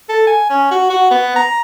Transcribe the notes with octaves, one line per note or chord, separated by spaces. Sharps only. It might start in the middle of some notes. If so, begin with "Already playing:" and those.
A4
G#5
C#4
F#4
F#4
B3
A#5